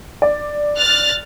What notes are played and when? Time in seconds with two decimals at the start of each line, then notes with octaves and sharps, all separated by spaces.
0.22 D5
0.76 F6 F#6 A6